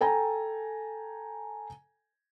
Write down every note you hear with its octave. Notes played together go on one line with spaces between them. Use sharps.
A4 G5 G#5 A#5